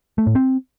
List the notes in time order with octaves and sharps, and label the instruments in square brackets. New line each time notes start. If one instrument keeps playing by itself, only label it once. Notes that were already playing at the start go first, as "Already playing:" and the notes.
[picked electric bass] A3
A2
C4